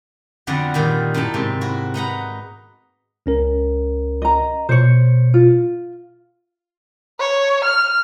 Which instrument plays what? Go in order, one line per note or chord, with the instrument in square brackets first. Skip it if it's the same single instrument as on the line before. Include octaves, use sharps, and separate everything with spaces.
[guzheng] F2 D3 F#3 B3 D5 F#5
A#2 D#3 G3
F#2 A2 D#4 A4 A5
G#2 C3
E4 F#4
D#4 B4 F#5 A#5
[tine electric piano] C#2 C#4 A#4
[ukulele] D#5 A#5
[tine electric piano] B2 C#7 [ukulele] C5 C#5
[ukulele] F4
[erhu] C#5
F6